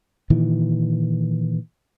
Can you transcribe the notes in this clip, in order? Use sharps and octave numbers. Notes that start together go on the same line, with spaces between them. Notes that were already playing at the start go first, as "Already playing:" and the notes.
A#2 D#3 E3